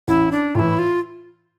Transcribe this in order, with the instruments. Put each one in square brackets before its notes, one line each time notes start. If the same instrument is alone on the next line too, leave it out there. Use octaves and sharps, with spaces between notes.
[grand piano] A1 [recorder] E4
[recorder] D4
[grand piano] A2 E3 [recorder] E4 F4
[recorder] F4